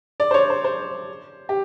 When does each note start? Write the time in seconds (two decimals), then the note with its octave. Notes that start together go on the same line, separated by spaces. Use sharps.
0.20 D5
0.31 C5
0.34 C#5
0.50 C5
0.64 C5
1.49 G4